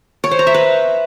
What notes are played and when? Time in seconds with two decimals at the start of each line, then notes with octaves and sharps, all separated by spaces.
0.24 C#5
0.31 C5
0.39 A#5
0.47 E5
0.54 B4